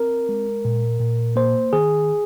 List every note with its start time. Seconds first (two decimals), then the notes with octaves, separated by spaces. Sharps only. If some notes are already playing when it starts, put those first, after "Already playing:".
Already playing: C4 A#4
0.29 G#3
0.65 A#2
1.00 A#2
1.36 A#3 C5
1.73 D#3 G#4